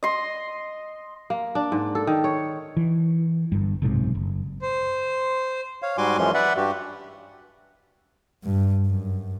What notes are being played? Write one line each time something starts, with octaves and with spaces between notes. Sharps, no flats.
D#5 C6
A#3
D4
G#2
A4
D#3
C#5
E3
G1 G2
F#1 B1 G#2 C3
F#1
C5
C#5 F5
G#2 G3 F#4 G#5 C6 D6
F#2 E3 F3 G#3 C#4 C6
B4 D5 E5 F#5
G2 F#4 G4
G2
F#2